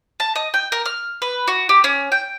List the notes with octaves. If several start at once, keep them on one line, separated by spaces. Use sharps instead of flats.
A5
D#5
G5
A#4
F6
B4
F#4
G4
C#4
G5